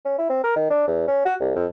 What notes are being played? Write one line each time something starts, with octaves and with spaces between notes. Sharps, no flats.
C#4
E4
C4
A#4
D#3
D4
E2
C#4
F#4
C2
F2